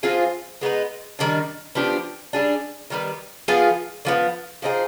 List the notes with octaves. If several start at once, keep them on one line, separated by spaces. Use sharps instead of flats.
F3 C4 F4 G#4
G#3 B3 D#4 B4
D#3 G3 D4
F3 B3 D4 G4
G3 D4 G#4
D#3 G3 B3
F3 B3 F4 G#4
D3 F3 B3
F3 C4 D#4 G#4